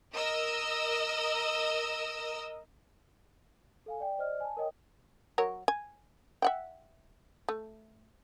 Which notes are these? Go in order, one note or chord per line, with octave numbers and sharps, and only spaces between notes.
A#4 D#5 E6
A4 F5 G#5
D5 G5
C5 D5 D#5 F6
G#5 A5
A#4 C#5 D#5 G5 D#6
F#3 A#4 C#5
G#5
E5 F#5 G5
A3